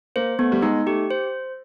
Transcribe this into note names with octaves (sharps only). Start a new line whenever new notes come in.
A#3 C5
A3 B3
G3
G#3 D#4
A3 G4
C5